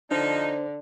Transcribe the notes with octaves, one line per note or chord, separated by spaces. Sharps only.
D3 F3 D4 D#4 C5